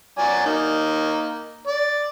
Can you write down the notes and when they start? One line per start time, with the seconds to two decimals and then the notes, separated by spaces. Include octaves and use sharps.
0.19 F#3 D5 G#5
0.46 A#3 D#4
1.68 D5